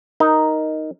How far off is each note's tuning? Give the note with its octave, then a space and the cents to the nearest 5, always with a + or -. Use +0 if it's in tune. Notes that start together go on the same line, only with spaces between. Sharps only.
D#4 +0 A#4 +0